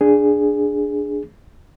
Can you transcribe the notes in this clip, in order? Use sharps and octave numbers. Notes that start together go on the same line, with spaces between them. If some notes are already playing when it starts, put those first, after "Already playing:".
D4 G#4